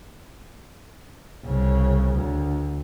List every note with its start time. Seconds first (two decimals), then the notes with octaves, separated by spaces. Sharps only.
1.44 C2 C#3
2.15 D2